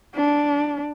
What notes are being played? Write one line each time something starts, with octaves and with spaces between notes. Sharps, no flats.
D4